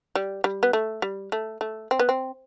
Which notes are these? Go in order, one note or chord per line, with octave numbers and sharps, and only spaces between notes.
G3
G3
B3
A3
G3
A3
A3
C4
B3
C4